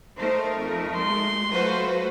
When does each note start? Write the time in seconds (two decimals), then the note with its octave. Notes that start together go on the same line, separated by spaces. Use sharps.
0.18 A3 D#4 A#4 C5
0.55 F2
0.98 G#3 C6
1.50 F#3 A3 F4 F#4 B4 C5